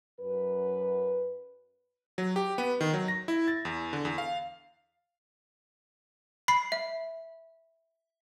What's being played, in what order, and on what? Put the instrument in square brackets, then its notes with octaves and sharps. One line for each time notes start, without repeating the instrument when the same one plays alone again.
[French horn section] F#2 B4
[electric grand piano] F#3
G4
B3
D#3
F#3
A#6
E4
A6
E2
D3
E2
F5
[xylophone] B5 C7
E5